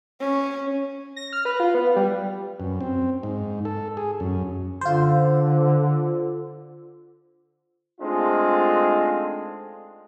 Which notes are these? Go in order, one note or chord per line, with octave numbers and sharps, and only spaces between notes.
C#4
A#6
F6
B4
F4
B3
G3
F#2
C4
G#2
A4
G#4
F#2
D3 F4 C5
G#3 A3 C4 D4 D#4 F4